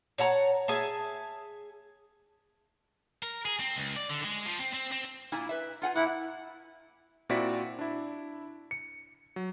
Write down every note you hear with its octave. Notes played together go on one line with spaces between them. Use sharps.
C#5 F#5 A5 A#5
G#4 E5 A5
A#4
G#4
C4
C#2
D5
D3
G#3
F3
C4
C4
C4
A#2 E4 G#5
B4 E5
F4 F#5 G#5
A#2 E4 F#5
A#2 C4 E4 F#4 D5 B6
D4 E4
C#7
F#3